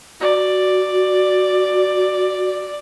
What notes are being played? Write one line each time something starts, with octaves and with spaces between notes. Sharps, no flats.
F#4 D5